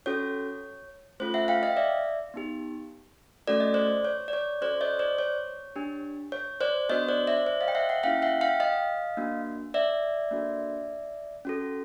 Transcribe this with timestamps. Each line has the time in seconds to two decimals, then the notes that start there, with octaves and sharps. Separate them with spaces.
0.06 C#4 F#4 A4 C#5
1.20 A3 C#4 F4 A4 C5
1.34 E5 F#5
1.48 F5 G5
1.63 D#5 F5
1.77 D5 E5
2.34 B3 D#4 G4
3.48 A3 C#4 F#4 A4 D5
3.60 D#5
3.74 C5 D5
4.05 C#5
4.28 D5
4.33 C#5
4.61 C#4 F#4 A4 C5 D5
4.81 C#5 D#5
4.99 C5 D5
5.18 C#5
5.76 D4 G4
6.32 C#5
6.61 C5 D5
6.89 B3 D4 F#4 C#5 D#5
7.09 C5 D5
7.27 D5 E5
7.46 C5 D5
7.61 D#5 F5
7.68 G5
7.75 E5 F#5
7.89 E5 F#5
8.03 A#3 C#4 E4 G4 F5 G5
8.22 E5 F#5
8.41 F5 G5
8.60 D#5 F5
9.17 A#3 D4 F#4
9.74 D5 E5
10.31 A#3 D4 F#4 A4
11.45 C#4 F#4 A4